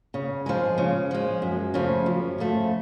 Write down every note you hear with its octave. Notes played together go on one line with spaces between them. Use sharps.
C#3
F3 G#3
C#3
F3 G#3
F#2
C#3 F3 A3
F#2
C#3 F3 A3